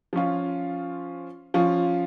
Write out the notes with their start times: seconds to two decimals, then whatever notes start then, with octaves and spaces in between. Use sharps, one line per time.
0.13 F3 C#4 F4
1.54 F3 C#4 F4